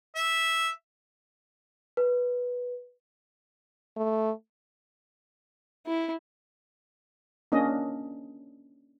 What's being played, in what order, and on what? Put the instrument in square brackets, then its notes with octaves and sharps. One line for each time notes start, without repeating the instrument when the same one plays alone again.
[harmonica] E5
[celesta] B4
[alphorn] A3
[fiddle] E4
[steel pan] A#3 C#4 D4 D#5